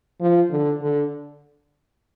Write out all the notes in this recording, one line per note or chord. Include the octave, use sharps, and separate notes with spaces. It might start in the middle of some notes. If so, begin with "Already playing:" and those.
F3
D3
D3